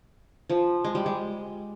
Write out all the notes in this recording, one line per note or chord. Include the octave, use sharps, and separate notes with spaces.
F3
G#3
G3
G#3